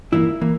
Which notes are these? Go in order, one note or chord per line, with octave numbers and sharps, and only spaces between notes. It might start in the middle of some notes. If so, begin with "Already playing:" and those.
G2 E3 A#3 E4
E3 A#3